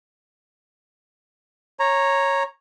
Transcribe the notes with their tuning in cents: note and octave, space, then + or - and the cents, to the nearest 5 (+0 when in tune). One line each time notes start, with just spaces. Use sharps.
C#5 -10 A#5 +0